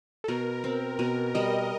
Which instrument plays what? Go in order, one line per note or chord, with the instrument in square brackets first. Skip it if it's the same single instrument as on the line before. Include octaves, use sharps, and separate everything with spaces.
[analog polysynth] A4
[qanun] B2 [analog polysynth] A#4
[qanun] C4
[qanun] B2 [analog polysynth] A#4
[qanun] G3 [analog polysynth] D#5